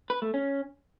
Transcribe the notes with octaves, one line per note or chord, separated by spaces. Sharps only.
B4
A3
C#4